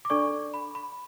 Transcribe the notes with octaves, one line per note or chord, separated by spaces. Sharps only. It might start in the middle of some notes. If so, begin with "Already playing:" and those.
D6
D4 A4 D5 C#6
B5
B5